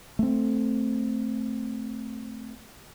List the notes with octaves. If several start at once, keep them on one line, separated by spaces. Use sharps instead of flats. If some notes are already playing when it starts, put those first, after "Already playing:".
A3 C4